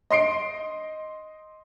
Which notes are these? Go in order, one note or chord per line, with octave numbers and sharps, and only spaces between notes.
D#5 C6 C7 D7